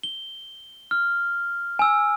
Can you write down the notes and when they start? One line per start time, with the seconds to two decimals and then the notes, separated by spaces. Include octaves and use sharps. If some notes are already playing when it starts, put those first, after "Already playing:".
0.03 G7
0.91 F6
1.79 G#5 E6